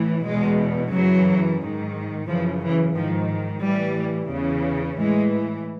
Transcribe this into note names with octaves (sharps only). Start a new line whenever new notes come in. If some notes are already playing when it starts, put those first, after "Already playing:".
Already playing: A2 E3
E2 B2 G#3
F#2 C#3 E3 F#3
G#2 D#3
F#2 C#3 E3 F3
E3
G#2 D#3 F3
A2 E3 G3
E2 C#3 E3
A2 E3 G#3